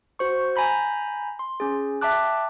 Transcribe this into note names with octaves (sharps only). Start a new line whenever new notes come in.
F#4 C5 C#6
G#5 A#5 B5 G6
C6
C#4 G#4
E5 G5 A5 D6 F#6